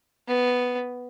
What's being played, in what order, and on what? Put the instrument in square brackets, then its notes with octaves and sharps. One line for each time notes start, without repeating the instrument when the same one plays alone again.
[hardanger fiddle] B3